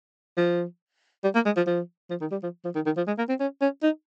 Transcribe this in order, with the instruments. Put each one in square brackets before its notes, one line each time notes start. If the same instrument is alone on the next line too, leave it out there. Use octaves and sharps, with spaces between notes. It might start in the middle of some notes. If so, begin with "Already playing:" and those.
[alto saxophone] F3
G3
A#3
G#3
F3
F3
F3
D#3
G3
F3
F3
D#3
D#3
F3
G#3
A#3
C4
C#4
C#4
D#4